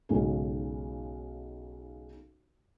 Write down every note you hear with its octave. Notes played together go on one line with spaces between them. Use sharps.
B1 G#2 C#3